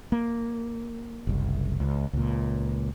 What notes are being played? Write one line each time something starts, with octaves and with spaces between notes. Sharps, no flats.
A#3
F#1 C2
C#2
C#2 A#2